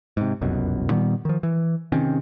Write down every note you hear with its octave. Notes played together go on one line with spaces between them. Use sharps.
G#2 C3
F1 C2 F#2 B2
A#2 D#3 G3 B3
D#3 F3
E3
C3 D#3 C4 C#4